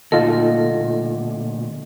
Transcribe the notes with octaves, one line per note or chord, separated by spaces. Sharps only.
D2 A#2 D#4 F4 A4 D#5